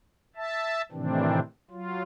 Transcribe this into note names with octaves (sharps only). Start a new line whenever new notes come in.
E5 A5
A2 C3 D#3 E3 C4 D4
F#3 F4